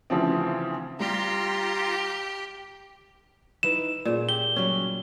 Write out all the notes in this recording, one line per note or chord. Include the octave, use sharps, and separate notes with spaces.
D2 C#3 E3 F3 C4
G3 F4 G4 A#5 C6
D#4 E4 B4 E7
A#2 C#4 G#4
G4 G7
C#3 F#3 G3 C#4